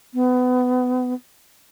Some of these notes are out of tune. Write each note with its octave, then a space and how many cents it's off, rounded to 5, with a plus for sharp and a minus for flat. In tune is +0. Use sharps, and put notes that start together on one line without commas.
B3 +25